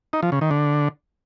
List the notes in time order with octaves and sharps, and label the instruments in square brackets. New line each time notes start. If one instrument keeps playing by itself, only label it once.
[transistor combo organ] D#4
F3
C#3
D#3
D3